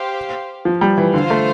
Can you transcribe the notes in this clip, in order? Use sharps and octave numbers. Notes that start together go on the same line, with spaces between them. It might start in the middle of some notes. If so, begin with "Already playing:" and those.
Already playing: G4 C5 F5
F3
G3
E3
D3 F4 C5 F5
A3